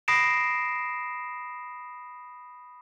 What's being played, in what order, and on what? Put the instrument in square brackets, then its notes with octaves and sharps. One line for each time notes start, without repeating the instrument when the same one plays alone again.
[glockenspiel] B5 D#6 A#6 C7 D7 E7